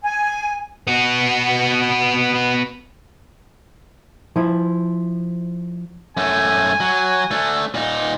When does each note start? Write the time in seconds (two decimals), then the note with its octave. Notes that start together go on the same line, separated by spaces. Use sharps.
0.04 G#5
0.87 B3 F#4
4.36 F3 E4
6.17 F#2 A3 G#5
6.80 F#3
7.31 A3 D4
7.74 A#2 D#4